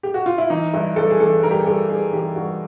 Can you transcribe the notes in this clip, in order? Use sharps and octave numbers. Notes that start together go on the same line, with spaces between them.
G4
F#4
F4
E4
E3 D#4
G2 E4
G2 A4
G#4
E3 A4
G2 A#4
G4
G#4
G2 A4
G2 G#4
E3 G4
G2 F#4